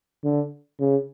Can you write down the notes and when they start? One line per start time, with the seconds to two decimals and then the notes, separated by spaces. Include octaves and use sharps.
0.24 D3
0.80 C#3